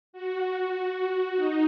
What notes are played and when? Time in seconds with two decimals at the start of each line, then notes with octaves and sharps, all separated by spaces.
0.13 F#4
1.36 D#4